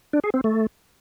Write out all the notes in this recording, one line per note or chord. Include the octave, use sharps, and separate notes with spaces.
D4
G#4
C4
A3